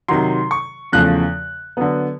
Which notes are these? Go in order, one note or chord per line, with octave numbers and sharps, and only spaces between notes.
C3 D#3 F#3 C6
C#6
E2 C#3 F3 A3 F#6
D3 F#3 B3